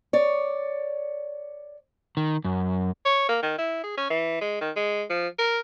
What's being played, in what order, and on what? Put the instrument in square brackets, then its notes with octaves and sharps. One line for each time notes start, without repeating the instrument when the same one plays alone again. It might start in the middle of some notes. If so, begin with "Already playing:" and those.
[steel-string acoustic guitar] C#5 D5
[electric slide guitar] D#3
F#2
[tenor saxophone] C#5
A#3
D#3
E4
G#4
C#4
E3
G#3
D#3
G#3
F3
A#4